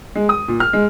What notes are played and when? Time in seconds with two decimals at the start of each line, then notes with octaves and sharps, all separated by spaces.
0.15 G#3
0.29 D#6
0.48 A#2
0.60 F6
0.73 G#3